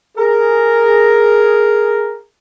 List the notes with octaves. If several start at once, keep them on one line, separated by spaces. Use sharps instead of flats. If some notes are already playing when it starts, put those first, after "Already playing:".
G#4 A#4